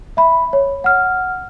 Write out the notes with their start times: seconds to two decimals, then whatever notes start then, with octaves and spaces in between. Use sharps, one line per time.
0.17 E5 B5
0.53 C#5
0.84 F#5 F6